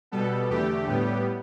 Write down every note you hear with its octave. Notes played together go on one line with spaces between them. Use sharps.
B2 G3 B3 A4
E2 D3 A3 G4
A2 G3 B3